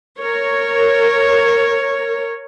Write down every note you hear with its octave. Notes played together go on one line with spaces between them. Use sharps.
A#4 C#5